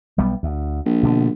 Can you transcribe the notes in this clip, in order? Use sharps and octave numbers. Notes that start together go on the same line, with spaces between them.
B1 G3 B3
D2
A#1
B2 D3